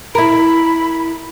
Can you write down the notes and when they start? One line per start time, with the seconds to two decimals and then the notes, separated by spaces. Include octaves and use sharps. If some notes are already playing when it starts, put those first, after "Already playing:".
0.15 E4 A#4 B5